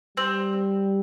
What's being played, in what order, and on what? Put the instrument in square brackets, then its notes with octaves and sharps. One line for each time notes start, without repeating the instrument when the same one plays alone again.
[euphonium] G3 [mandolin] C4